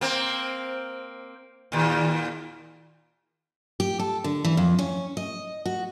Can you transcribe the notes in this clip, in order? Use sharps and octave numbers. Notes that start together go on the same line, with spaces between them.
A#3 C4
D#2 A#2
G4
A4
D3
E3
F2
C#4
D#5
F#4